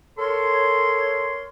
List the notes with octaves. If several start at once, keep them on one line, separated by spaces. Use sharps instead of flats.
A4 A#4 C#5 C6